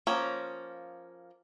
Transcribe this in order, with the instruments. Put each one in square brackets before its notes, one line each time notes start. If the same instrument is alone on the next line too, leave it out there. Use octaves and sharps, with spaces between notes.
[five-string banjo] F3 A#3 C#4